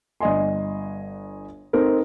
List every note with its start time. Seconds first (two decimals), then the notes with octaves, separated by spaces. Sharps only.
0.20 G1 D5 D#5 G#5 C6
1.73 C4 D#4 A4 A#4